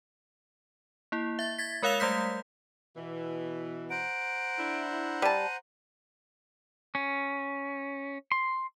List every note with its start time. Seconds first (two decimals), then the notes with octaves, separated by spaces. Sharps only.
1.12 A#3 E4
1.39 E5 A6
1.58 G#6 A6 B6
1.82 G#3 A#4 C#5 F5 E6 F7
2.00 G3 A3 G6 B6
2.97 B2 E3
3.90 C5 F#5 A#5 D7
4.59 D4 E4
5.22 G3 A5 D#7
6.95 C#4
8.32 C6